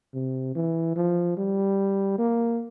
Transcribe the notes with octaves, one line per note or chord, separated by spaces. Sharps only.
C3
E3
F3
G3
A#3